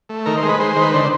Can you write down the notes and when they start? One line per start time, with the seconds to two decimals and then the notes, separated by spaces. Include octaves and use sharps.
0.09 A3
0.26 D#3 A#4
0.37 C5
0.42 G#3
0.49 B4
0.60 G#3 C5
0.76 D#3
0.82 B4
0.93 D3 C5